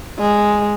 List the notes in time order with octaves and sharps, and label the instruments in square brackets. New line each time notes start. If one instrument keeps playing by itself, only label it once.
[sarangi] G#3